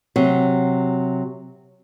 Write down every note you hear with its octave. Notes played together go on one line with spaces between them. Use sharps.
C3 F#3